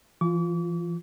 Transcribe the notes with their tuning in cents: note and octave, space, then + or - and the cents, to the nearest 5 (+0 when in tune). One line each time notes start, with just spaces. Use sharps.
E3 +40 F4 +0 D6 -40